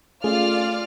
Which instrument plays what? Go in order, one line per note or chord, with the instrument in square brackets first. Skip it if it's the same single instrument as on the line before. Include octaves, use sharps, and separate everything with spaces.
[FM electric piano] A3 C#4 G#4 [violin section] F4 D5 F6